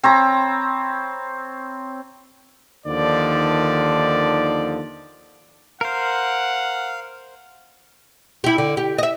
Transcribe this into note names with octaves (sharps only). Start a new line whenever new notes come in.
C4 C#5 A#5 B5
D#2 D3 D#3 F3 D5
A#4 C5 F5 F#5
E4 G4
D3
G4
D#5 E5